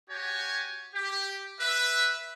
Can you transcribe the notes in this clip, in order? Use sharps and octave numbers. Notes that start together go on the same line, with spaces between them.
F#4 G4 C#5 G#5
G4
B4 E5